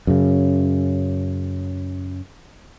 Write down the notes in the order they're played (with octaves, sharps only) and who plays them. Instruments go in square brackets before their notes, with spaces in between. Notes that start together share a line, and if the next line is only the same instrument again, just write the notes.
[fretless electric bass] F#2 C#3